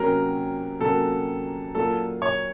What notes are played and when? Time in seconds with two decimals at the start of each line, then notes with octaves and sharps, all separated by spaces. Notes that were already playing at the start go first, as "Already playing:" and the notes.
Already playing: C3 F#3 A#3 C#4 F#4 A#4
0.80 C3 F#3 A#3 C#4 F#4 A4
1.74 A#2 F#3 A#3 F4 A4
2.22 C#5